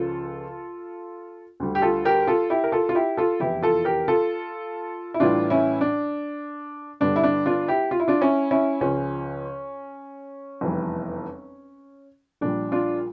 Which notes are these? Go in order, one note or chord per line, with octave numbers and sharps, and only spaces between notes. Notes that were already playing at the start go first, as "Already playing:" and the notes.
Already playing: C#2 C#3 F3 F4 A4
D2 D3 G3
G4
F4 A4
G4 A#4
F4 A4
E4 G4
A#4
F4 A4
F4
E4 G4
F4 A4
F1 E2 E3 E4 G4
F4 A4
G4 A#4
F4 A4
E4
A1 A2 E3 G3 D4 F4
C#4 E4
D4
G1 G2 D3 D4
E4
D4
D4 F4
E4 G4
F4
E4
D4 F4
C#4 E4
C#4 E4
C#2 C#3 F3 C#4
F1 E2 E3 G3
A#1 A#2 G3 D4
D4 F4